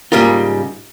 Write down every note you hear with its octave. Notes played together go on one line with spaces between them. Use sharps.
G#2 C#3 G3 A#3 F4